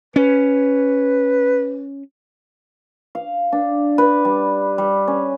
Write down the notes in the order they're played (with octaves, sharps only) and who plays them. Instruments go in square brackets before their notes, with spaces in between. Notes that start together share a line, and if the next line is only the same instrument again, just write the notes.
[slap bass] C#4 [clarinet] B4
[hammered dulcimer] F5
D4
B4
G3
G3
C#4